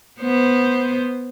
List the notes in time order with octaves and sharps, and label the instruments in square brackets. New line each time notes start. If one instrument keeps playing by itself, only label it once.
[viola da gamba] B3 C5